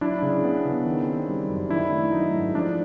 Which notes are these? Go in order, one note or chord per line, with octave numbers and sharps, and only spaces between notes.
F#3 D4 E4
C#3
B3
C#3
D#3
C4
G3
F#2
D#3 D4 E4
A3
F#3 D#4
G#2
F3 D4